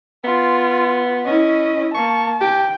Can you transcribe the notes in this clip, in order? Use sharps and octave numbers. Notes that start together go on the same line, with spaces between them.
B3 F4
C#4 E4 D#5
A#3 A5 C#6
G4 G5